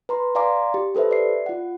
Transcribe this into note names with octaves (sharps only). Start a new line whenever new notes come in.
B4 A#5 C6
D5 F5 G#5 A#5 C6 D6
G4
G4 A4 B4 C5 E5
D5 C7
F4 F#5